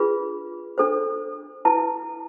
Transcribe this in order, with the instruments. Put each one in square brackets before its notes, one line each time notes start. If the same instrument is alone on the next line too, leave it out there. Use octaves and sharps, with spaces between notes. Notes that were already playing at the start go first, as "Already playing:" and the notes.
Already playing: [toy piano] D4 F4 G#4 B4 B5
D4 A4 C5
E4 B4 A5